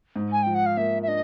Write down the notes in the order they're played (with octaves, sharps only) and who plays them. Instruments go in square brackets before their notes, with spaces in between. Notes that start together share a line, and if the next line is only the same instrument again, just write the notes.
[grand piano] G#2
[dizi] G#5
[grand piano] F3 [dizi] G5
[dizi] F#5
F5
[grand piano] A#3 [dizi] E5
[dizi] E5
[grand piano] D4 [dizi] D#5